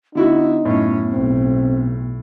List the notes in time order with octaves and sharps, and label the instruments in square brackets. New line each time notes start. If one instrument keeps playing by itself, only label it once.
[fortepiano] D3 E4 F#4 [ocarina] B3 [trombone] D#4
[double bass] F#2 C#4 [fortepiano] A2
[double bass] B1 [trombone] C4